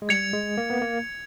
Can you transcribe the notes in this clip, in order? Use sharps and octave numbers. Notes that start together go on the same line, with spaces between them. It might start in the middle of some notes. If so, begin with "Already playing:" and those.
G#3
G3 G#6 C#7 F7
G#3
A#3
B3
A#3